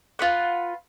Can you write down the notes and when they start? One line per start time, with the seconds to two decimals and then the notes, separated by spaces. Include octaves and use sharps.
0.19 F4 B4 F#5